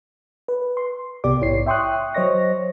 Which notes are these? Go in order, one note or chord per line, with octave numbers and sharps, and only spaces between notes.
B4
C6
C2 C3 B3 G4 D5 D6
A#1 G#2 E4 C#5 C7
E5 G5 C6 C#6 D#6 F#6
F#3 C5 C#5 D#5 C#6 A#6